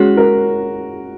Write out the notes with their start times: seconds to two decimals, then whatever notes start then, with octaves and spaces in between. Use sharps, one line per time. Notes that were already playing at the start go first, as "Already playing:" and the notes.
Already playing: G#3 C#4 F#4 G#4 C#5
0.17 A#4